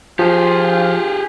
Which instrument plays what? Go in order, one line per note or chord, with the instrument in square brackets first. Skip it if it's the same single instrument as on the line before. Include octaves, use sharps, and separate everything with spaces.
[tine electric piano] F3 [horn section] F4 [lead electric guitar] G4 G#4